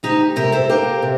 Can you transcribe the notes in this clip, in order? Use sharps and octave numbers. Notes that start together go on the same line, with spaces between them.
D2 D#4 G4
C3 G4 A#4
A4 C5
A#3 G4 A#4
C3